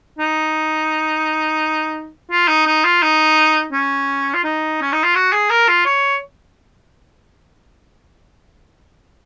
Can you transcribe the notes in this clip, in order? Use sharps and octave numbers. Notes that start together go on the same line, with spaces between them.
D#4
F4
D#4
D#4
F4
D#4
C#4
F4
D#4
C#4
D#4
F4
F#4
G#4
A#4
F4
C#5